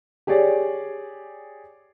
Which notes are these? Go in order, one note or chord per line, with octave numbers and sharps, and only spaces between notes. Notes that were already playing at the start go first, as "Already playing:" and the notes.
G4 G#4 C#5 D5